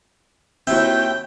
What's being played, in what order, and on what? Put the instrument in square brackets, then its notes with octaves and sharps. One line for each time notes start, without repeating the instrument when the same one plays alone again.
[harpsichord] D#2 E5 [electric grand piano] C4 E4 F#4 [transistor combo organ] G5